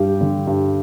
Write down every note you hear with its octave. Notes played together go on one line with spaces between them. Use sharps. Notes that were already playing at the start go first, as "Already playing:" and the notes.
Already playing: G2 G3 G4
D3
G2